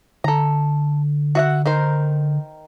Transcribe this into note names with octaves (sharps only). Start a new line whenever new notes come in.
D3 A4 A#5
F#4 E5 F#5
D#3 A#4 C5